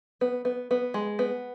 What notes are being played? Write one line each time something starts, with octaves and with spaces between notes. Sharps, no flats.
B3
B3
B3
G#3
B3